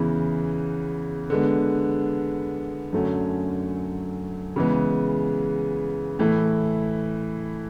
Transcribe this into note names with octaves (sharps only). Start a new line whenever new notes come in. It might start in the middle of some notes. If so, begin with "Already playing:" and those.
Already playing: E2 C#3 E3
D3 G#3 B3
F#2 D3 F#3 A3 C#4
C#3 E3 G#3 B3
A2 E3 A3 E4